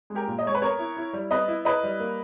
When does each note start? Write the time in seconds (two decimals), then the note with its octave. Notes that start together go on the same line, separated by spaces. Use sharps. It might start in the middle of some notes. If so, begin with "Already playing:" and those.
0.10 G#3
0.15 G4 A#4
0.28 A#2
0.39 D#5
0.45 G#3 C#5
0.54 B4
0.62 B3 A#4 C#5
0.79 E4
0.97 E4
1.13 G3
1.31 B3 B4 D#5
1.48 E4
1.65 E4 B4 D#5
1.83 G3
2.00 A#3